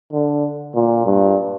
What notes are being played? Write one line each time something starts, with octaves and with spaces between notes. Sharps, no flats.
D3
A#2
G2